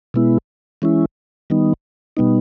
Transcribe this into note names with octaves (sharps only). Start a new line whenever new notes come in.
B2 G#3 B3 E4
E3 G#3 C#4 E4
D#3 G3 B3 D#4
B2 G3 B3 D#4